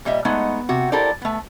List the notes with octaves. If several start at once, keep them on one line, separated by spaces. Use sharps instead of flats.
A#2 G3 D#5 E5
G#3 A3 B3 D#4 F#5
C3 F#4
E4 G4 A4 A#4 C5 D5
A3 B3